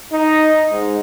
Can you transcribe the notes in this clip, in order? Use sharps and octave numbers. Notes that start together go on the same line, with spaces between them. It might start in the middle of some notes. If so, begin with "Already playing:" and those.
D#4
G#2